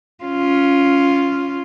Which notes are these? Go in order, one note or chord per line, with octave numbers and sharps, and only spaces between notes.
C#4 F4